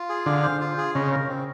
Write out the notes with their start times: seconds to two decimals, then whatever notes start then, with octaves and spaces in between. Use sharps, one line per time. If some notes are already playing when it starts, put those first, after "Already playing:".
Already playing: F4
0.09 G#4
0.26 D3 F5
0.43 C5
0.61 F4
0.78 G#4
0.95 C#3 D#5
1.12 A#4
1.29 C4